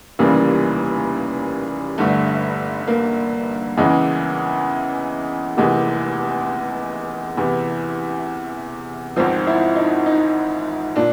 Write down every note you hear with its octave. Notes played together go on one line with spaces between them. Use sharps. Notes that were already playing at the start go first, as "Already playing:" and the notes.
F1 D#2 C#3 E3 G3 A#3
G1 G2 D3 A3
A#3
E2 C#3 E3 G#3
F1 E2 C3 E3 G#3 A#3
E2 C3 E3 B3
G#1 G#2 F3 C4
E4
D#4
D#4
A#2 D4